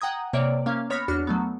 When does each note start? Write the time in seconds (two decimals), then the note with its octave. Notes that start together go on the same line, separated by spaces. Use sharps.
0.01 F#5 G5 A#5 D#6 G#6
0.33 C3 A#3 C#5 D5 E5 D7
0.66 A#3 C#4 F5
0.90 B3 C#5 B5 F6 A#6 B6
1.08 E2 D4 F#4 F6 C#7
1.27 F#3 A3 B3